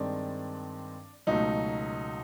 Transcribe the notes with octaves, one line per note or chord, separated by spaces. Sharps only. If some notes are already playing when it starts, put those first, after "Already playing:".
Already playing: G2 D#3 G#3 C4 D4
C#2 B2 F#3 A3 D#4